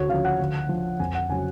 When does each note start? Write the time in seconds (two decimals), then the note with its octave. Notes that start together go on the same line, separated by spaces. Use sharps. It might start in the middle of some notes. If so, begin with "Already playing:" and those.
Already playing: D2 F#4 C#5
0.09 C#3 F3 F5
0.25 F#5
0.39 D2
0.69 D3 F3
0.99 F2 G#5
1.15 F#5
1.30 C#3 F#3 G#5